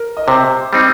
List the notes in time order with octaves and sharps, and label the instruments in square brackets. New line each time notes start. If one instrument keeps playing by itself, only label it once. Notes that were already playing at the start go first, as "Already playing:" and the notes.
Already playing: [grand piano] A#4
D#5
[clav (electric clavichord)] C3 [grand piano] C5
[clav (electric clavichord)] G3 C4 D#4